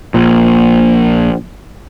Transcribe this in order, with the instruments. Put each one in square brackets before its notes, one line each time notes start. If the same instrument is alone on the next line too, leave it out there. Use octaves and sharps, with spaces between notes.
[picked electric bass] A#1 A#2